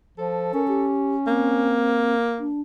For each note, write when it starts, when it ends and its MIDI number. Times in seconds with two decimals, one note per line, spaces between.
0.18 0.53 53
0.18 0.90 69
0.54 1.85 61
0.54 0.63 70
0.68 1.16 67
1.27 2.51 58
1.27 2.14 60
2.39 2.61 62